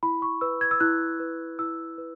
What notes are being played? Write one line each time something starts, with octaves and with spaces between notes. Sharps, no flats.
E4 B5
C#6
B4 E6
G#6
E6
E4 F#6
B4
E4 E6
B4